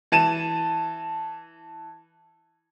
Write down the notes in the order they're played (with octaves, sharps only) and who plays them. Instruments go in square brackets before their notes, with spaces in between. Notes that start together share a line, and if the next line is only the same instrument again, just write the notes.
[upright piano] E3 A5 D#7 E7